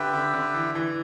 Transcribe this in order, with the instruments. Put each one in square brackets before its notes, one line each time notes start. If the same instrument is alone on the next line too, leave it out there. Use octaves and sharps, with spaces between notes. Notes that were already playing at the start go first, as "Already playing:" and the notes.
Already playing: [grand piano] D3 [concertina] G4 B4 E5 G5
[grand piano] D3
D3
E3
E3